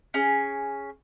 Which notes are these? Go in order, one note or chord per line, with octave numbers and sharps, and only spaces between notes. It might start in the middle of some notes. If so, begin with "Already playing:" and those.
C#4 G#4